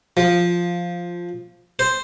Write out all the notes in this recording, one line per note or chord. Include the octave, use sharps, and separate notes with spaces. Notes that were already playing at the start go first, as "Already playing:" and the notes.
F3
C5